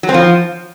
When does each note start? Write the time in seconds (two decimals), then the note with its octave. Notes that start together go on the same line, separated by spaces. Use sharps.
0.03 F#3
0.09 C4
0.14 F3